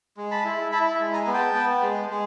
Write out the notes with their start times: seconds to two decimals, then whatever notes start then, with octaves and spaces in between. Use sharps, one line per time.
0.17 G#3
0.31 A5 B5
0.44 E4
0.72 E4 A5 B5
1.00 G#3
1.13 G#5 A#5
1.27 B3
1.34 G5 A5
1.54 B3
1.82 G#3
2.09 G#3